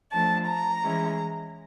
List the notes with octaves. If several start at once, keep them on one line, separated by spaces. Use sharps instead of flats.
F3 A3 D4 A5
A#5
E3 G#3 C#4 E4